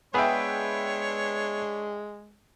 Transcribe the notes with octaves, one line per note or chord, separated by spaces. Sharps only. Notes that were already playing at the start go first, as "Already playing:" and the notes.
G#3 B3 D4 G#4 B4 C#5 E5 G5